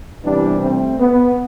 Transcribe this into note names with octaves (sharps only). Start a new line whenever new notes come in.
C2 C3 E3 G3 B3 D4
A3 C4
B3